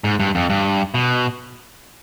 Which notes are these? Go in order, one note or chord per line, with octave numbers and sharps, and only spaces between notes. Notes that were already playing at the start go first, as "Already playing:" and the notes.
G#2
G2
F2
G2
B2